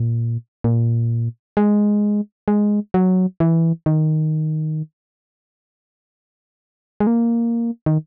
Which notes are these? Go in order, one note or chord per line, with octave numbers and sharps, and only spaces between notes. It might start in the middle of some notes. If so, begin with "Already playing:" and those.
Already playing: A#2
A#2
G#3
G#3
F#3
E3
D#3
G#3
A#3
D#3